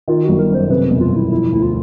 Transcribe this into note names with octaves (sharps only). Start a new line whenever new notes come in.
D#3 F4
G1 F#4
A#4
F#2 C5
C3 B4
E1
F4
E1 E4
F3 E4
D2 E4
F4